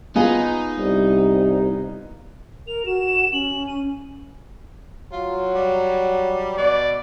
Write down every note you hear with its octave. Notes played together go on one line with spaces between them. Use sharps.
B3 D#4 F4 G#4
C2
A#4 F7
F#4 E7
C#4 F#7
D#7
F#3 F4
G3
B2 D5